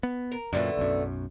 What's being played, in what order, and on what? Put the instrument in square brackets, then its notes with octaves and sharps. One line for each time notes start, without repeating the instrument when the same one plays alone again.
[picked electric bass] B3
[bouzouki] A#4
[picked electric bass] F#2 A#2 [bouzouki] D3 A3 B3
[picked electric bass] B1 F#2